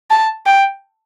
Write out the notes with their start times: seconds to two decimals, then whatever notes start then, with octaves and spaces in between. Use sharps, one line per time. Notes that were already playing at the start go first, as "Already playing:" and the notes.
0.11 A5
0.46 G5